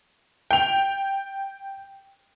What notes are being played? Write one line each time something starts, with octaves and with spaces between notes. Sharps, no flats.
G5 F7